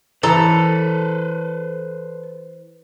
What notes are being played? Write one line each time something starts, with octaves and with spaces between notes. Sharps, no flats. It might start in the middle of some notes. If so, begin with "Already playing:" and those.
E3 A4 B4 C5 A#5